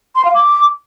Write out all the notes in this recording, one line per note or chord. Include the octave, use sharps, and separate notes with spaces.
C6
F5
D6